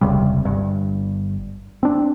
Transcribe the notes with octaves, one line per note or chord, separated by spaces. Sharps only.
E1 C#2 C3 G3
G1 G2
C4 D4